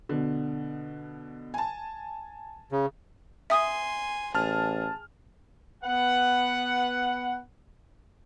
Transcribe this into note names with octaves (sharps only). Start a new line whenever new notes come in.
B2 D3
G#5 A5
C#3
E5 G#5 C6 D#6
A1 G#4 A5 F6
B3 B4 F#5